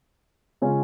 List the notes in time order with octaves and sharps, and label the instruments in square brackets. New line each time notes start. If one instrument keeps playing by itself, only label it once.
[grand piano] C#3 G#3 C#4 F4